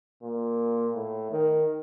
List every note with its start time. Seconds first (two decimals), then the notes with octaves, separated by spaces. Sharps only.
0.23 A#2
0.95 A2
1.31 D#3